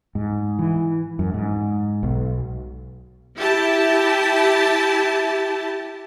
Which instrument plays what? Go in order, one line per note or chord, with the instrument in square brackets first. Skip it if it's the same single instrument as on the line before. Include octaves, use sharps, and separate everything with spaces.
[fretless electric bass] G#2
E3
F#2
G#2
B1
[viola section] E4 G4 A5